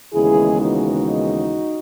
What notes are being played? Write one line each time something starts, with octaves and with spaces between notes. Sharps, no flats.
D#2 C#3 E3 G#3 B3 E4 G#4
D#4 F#4